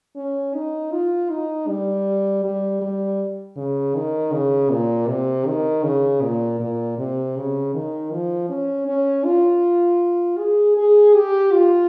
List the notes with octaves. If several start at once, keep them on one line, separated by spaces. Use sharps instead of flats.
C#4
D#4
F4
D#4
G3
G3
G3
C#3
D#3
C#3
A#2
C3
D#3
C#3
A#2
A#2
C3
C#3
D#3
F3
C#4
C#4
F4
G#4
G#4
G4
F4